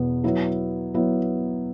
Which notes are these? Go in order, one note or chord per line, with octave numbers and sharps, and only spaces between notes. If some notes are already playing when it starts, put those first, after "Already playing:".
Already playing: E2 B2 B3
F#3 B3 E4
F#3 B3 E4